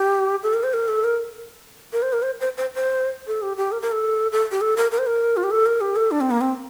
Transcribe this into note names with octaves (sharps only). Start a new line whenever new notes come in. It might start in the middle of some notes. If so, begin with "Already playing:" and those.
Already playing: G4
A4
A#4
C5
A#4
A4
A#4
A#4
C5
A#4
C5
C5
C5
C5
A4
G4
G4
A#4
A#4
A4
A4
G4
A4
A#4
A#4
C5
A#4
F4
G4
A4
A#4
G4
A4
D4
C4
A#3
C4